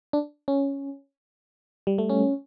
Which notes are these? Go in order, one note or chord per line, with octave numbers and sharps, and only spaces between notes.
D4
C#4
G3
A3
C#4